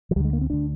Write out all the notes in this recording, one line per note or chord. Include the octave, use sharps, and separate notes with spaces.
F3
D2 D3 G3 G#3
A#3
C4
D2 D3 D4